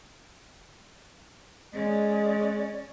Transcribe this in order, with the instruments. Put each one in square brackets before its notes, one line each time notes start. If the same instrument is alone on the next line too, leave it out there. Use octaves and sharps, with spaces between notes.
[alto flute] G#3 [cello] C#4 D5 [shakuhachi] D#5